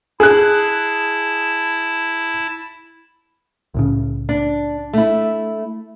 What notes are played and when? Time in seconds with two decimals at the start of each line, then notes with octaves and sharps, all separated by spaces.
0.20 E4 G#4 A5 F#6
3.74 C2 A2 C#3
4.29 D4
4.93 A3 E4